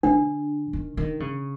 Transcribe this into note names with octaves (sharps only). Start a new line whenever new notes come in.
D3 D4
D#3
D#3
C#3